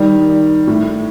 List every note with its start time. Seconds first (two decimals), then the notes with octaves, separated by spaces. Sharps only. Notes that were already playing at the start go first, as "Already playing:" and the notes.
Already playing: D#3 G3
0.67 A2